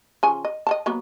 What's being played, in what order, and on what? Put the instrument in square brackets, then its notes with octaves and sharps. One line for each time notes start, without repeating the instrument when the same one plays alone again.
[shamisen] C#3 F3 G#5
D#5
D#5 F#5 A5
F#3 A#3 B3